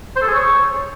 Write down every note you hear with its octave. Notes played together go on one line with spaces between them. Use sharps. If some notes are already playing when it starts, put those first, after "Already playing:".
C5
A4
G#4
C#5